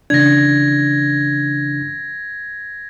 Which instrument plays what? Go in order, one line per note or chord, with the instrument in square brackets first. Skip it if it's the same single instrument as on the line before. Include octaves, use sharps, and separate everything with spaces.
[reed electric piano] C#3 E3 D4 [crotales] G#6 A#6